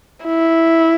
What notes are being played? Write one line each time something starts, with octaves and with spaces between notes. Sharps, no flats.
E4